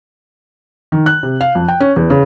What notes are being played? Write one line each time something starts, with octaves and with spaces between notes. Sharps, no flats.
D#3
F#6
C3
F5
F2
G5
C#4
E2
C#3